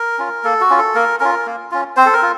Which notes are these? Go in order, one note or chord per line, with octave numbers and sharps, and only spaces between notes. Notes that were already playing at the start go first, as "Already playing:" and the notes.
Already playing: A#4
C#4 F4
A#3 A4
F#4
C#4 F4
A4
A#3 A#4
C#4 F4 A#4
A#3
C#4 F4
C4 C5
A4
A#4
F4